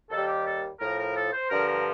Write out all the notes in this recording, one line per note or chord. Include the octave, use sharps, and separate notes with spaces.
D#2 D#3 G3 A4
G4
A4
A2 F3 A#4
A#4
A4
C5
G2 D3 F3 A#4
A#4